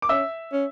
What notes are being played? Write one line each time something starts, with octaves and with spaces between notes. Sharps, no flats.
D6
C#4 E5 E6
C#4